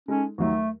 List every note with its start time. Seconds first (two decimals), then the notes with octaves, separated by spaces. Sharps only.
0.08 G#3 C#4 D#4 A4
0.38 D#2 D#3 F#3 A3